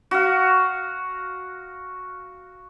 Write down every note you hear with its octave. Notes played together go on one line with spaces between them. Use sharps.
F#4 F5